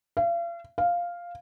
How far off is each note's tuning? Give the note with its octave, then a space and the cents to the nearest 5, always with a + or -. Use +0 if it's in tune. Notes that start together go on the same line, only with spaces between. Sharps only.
F5 -40
F5 +0